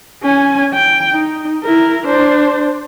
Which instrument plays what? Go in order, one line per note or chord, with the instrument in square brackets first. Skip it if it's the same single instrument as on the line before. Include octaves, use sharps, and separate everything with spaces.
[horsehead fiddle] C#4 G#5
G5
D#4
E4 A#4
D4 C5